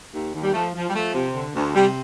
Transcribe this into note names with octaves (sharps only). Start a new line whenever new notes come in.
D#2
D#2
G3
F3 A3
F3
G3
F3 A3
C3
D3
D2
C3 G3